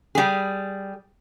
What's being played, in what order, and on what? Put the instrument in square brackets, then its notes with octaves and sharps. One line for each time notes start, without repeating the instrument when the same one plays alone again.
[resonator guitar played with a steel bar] G3 G#4